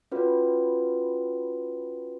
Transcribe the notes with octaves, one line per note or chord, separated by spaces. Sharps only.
C#4 F4 F#4 B4